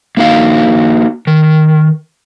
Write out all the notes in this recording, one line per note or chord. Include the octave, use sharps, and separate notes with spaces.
A#3 D#4 F#4 F5
D#3